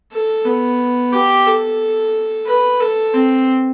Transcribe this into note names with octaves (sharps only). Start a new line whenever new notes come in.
A4
B3
G4
A4
B4
A4
C4